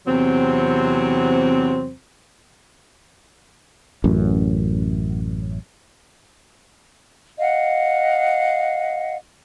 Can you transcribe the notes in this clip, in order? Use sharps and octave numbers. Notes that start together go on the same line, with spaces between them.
E2 C3 F#3 C4
A1 F#2
D#5 F5 F#5